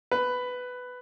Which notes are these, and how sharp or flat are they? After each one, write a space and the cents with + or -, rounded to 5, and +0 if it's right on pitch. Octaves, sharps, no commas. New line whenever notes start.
B4 +10